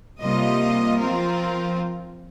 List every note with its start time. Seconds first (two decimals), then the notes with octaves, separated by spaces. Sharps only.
0.21 C3 G3 A#3 F4 D#5
0.99 F3 C4 F4 A#4